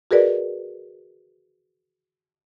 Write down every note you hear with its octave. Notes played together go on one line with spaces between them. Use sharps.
F#4 G#4 A#4 B4 D5 D#5